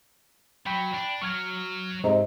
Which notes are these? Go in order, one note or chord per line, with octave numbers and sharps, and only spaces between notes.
F#3 G5 B5
D4
F#3 C#6 F6 G#6
G#2 C3 G#3 C5 D#5 A#5